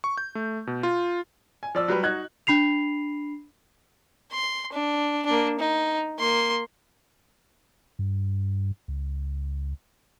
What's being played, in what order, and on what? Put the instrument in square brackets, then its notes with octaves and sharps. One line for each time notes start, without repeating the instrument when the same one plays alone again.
[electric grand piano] C#6
G6
A3
B2
F4
[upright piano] G#5
F3 D5 E6
F#3 G3 B4
D#4 F#4 F#6 G#6
[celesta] D4 B5 C7 F7
[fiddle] C6
D4
A#3 D4
D#4
A#3 C6
[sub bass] G2
C#2